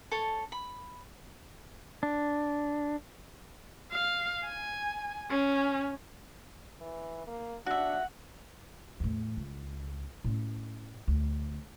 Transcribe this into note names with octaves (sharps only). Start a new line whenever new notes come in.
A4 C#5 A5
B5
D4
F5
G#5
C#4
E3
A#3
D4 F#4 E5 F#5
E2 A2
C#2
A2 C#4
D2